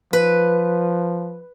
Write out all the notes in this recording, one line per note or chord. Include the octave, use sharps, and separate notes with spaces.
F3 B4